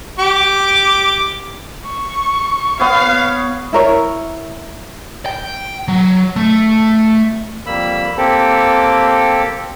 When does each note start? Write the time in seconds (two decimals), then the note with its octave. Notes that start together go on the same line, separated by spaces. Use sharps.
0.19 G4 D6
1.86 C#6
2.80 B3 C#5 F5
3.73 E4 A#4 C#5
5.26 G5
5.88 F#3
6.36 A3
7.66 F2 G3 A#3 B5 E6
8.17 A#3 C4 G4 A4